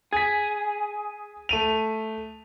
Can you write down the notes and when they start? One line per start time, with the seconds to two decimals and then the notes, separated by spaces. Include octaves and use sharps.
0.13 G#4 G#6 B6
1.49 A3 D#7 F7